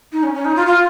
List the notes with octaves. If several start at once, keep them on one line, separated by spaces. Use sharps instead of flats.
D#4
C#4
C#4
D#4
F4
F4